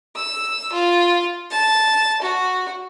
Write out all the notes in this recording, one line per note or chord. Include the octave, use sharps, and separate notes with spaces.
E6
F4
A5
F#4